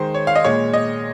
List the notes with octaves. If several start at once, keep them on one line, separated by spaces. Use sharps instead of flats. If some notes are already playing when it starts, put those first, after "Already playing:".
Already playing: D#3 G#3 C5
C#5
F5
D#5
A#2 G#3 C#5
D#5